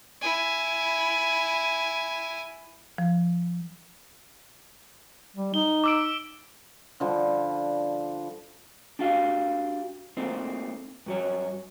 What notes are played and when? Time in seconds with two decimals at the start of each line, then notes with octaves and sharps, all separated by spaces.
0.22 E4 G#5
2.98 F3
5.36 G3
5.54 D#4 G7
5.84 D6 E6 D7
7.00 D3 F3 G3
8.99 D4 F#4 G4 F5
10.17 A3 A#3 C4 D#4
11.06 G2 F#3 C#5